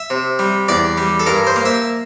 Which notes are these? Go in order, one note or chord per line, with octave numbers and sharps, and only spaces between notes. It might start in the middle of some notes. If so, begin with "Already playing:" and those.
Already playing: E5
C3
G3
E2 D5
G3
A4
G2 A#4
C5
A#3
E5